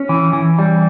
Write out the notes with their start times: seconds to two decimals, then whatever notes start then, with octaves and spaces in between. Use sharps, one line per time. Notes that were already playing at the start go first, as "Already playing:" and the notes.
Already playing: C#4
0.09 E3
0.33 E3
0.59 G3